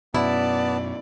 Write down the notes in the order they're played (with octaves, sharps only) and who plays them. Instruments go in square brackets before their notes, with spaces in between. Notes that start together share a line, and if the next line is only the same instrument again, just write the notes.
[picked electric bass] F#2 B2 [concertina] B3 A5 [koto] E4 [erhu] D5